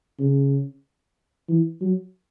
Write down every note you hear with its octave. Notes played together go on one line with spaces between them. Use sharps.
C#3
E3
F#3